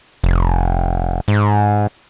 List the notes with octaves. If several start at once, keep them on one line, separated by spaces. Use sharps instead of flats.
F1
G#2